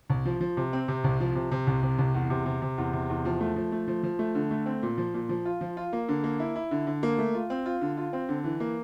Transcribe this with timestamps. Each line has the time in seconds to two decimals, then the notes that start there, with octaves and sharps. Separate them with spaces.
0.10 C2
0.25 F3
0.41 F3
0.57 C3
0.73 C4
0.88 C3
1.04 C2
1.20 F3
1.36 C3
1.51 C3
1.67 C2
1.83 C3
1.98 C2
2.14 E2
2.30 C3
2.46 C3
2.62 C3
2.78 E2
2.93 C3
3.09 E2
3.25 F3
3.41 A3
3.56 F3
3.72 A3
3.88 F3
4.03 F3
4.19 A3
4.35 D3
4.51 A3
4.66 C4
4.83 A#2
4.98 F3
5.14 A#2
5.29 F3
5.45 F4
5.61 F3
5.77 F4
5.93 A#3
6.09 D3
6.24 A#3
6.40 E4
6.56 E4
6.71 D3
6.87 D3
7.03 A#3
7.18 A3
7.35 F4
7.50 C4
7.66 F4
7.81 D3
7.97 F4
8.13 C4
8.29 D3
8.44 E3
8.60 A#3